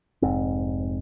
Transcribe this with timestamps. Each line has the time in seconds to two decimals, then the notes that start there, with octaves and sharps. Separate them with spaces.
0.22 F1 G#2 C4